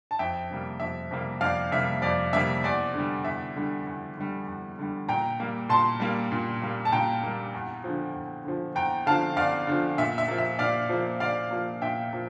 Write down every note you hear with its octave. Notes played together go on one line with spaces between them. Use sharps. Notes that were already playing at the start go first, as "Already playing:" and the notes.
A5
F2 E5 G5
C3 G3 A#3
F2 E5
C3 G3 A#3
F2 D5 F5
C3 G3 A#3 E5
F2 D5
C3 G3 A#3 E5
E2 D5
D3 G3
E2 E5
D3 G3
E2
D3 G3
E2
D3 G3
A#2 G5 A#5
G3 A#3
A#2 A5 C6
G3 A#3
A#2
G3 A#3
A5
A#2 G5 A#5
G3 A#3
E2
D3 F3
E2
D3 F3
E2 G5 A#5
D3 F3 F5 A5
E2 D5 F5
D3 F3
A#2 E5
E5
F3 A#3
E5
A#2 D5 F5
F3 A#3
A#2 D5 F5
F3 A#3
A#2 E5 G5
F3 A#3